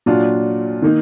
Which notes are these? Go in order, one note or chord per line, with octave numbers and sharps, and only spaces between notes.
A#2 F#3 D4 F4
D#3 A#3 D#4